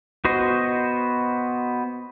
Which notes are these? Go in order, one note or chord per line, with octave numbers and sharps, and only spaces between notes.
B3 F#4 C5 D#5